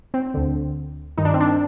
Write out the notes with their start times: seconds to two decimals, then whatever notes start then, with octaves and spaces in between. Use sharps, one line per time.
0.14 C4
0.34 D2 D3
1.18 G2 D#3 D#4
1.25 D4
1.34 C4
1.41 D4